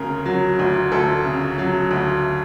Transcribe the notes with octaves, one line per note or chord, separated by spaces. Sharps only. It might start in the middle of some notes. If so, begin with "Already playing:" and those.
Already playing: D2 C#3 A#4
F#3
D2
D2 A4
C#3
F#3
D2